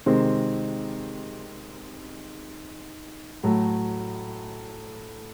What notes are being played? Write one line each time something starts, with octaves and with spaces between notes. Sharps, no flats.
C3 D#3 G#3 C4
A2 F#3 A3